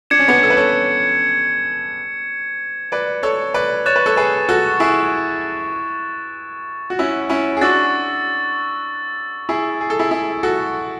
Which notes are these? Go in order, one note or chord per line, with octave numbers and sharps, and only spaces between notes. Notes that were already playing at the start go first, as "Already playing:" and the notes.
D4 G#6 C#7 E7
C#4
B3 D4
A4
B4
A4 C#5
B4 D5
A4 C#5
B4 D5
C#5 C#6 F#6 A6 E7
B4
A4 C#5
G#4 B4
F#4 A4
E4 G#4
F#4
C#4 E4
C#4 E4
G#4
D4 F#4 C#6 E6 A6
E4 G#4
G#4
A4
E4 G#4
E4 G#4
F#4 A4